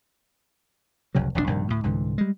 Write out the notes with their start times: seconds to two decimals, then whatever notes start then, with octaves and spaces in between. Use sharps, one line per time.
1.15 F1 C2 C#3 F#3
1.35 E1 A#1 G#2 D4
1.47 A#1 G2 C3 D#3
1.68 D2 A2
1.83 C2 G#2 D3 E3
2.18 G3 G#3